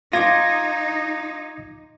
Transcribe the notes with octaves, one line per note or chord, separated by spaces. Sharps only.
D#4 F4 D6 G#6 A#6